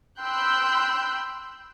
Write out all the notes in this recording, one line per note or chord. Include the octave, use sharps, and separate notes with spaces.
G5 B5 C6 E6 F#6 G6